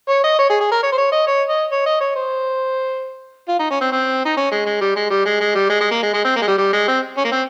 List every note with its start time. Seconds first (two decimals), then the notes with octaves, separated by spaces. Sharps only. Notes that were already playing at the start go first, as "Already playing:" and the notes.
0.09 C#5
0.24 D#5
0.39 C#5
0.50 G#4
0.60 G#4
0.71 A#4
0.83 C#5
0.92 C5
0.98 C#5
1.12 D#5
1.27 C#5
1.49 D#5
1.71 C#5
1.86 D#5
2.01 C#5
2.16 C5
3.48 F4
3.59 D#4
3.70 C#4
3.81 C4
3.92 C4
4.25 D#4
4.37 C#4
4.51 G#3
4.66 G#3
4.81 G3
4.96 G#3
5.10 G3
5.25 G#3
5.40 G#3
5.55 G3
5.69 G#3
5.80 G#3
5.91 A#3
6.02 G#3
6.13 G#3
6.24 C4
6.36 A#3
6.41 G#3
6.47 G3
6.58 G3
6.73 G#3
6.88 C4
7.17 C#4
7.24 A#3
7.32 C4